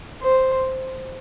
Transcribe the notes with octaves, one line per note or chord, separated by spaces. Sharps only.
C5